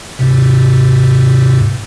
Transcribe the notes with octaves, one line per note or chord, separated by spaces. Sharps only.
D#2 G#2 C3